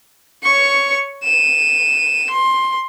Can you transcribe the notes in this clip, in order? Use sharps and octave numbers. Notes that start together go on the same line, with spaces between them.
C#5 C#6
D#7 E7
C6